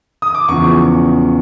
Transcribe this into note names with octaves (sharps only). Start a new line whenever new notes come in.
D#6
D6
E2 C#3 F3 C#6